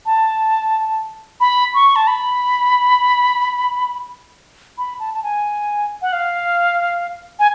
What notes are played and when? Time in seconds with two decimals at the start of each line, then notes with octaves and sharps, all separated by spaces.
0.06 A5
1.41 B5
1.75 C#6
1.96 A5
2.07 B5
4.78 B5
5.00 A5
5.14 A5
5.23 G#5
6.02 F#5
6.13 F5
7.39 G#5